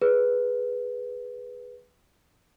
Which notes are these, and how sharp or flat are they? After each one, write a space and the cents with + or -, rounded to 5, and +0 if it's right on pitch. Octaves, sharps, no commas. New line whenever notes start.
G#4 +0 B4 -5